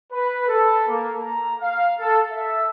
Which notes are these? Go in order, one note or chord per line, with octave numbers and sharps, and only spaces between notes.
B4
A4
A#3
A#5
F5
A4
E5